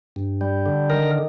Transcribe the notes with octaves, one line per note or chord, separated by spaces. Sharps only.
G2
G3
D3
D#3 A#4